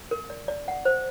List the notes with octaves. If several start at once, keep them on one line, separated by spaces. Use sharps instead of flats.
A#4
D5
D5
F#5
C5